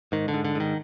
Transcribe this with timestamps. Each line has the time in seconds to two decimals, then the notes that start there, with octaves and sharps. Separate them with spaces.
0.12 G#2 D#3
0.28 D3
0.34 G#2
0.45 D3
0.55 G#2 D#3